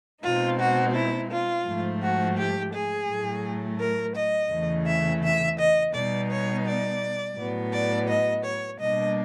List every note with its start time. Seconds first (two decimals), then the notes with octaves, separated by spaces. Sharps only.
0.22 B2 G#3 C4 D#4 F4
0.58 F#4
0.93 E4
1.29 F4
1.65 G#2 F3 A3
2.01 F#4
2.36 G4
2.72 G#4
3.08 A2 F#3 A3
3.79 A#4
4.14 D#5
4.50 E2 C#3 E3 A3
4.86 E5
5.22 E5
5.57 D#5
5.93 B2 G3 B3 D#4 D5
6.29 C#5
6.65 D5
7.36 A2 F#3 B3
7.72 D5
8.07 D#5
8.43 C#5
8.79 B2 G3 A#3 D4 D#5